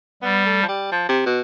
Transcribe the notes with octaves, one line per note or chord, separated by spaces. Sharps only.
G3 B3
A3
F3
G3
F3
C3
B2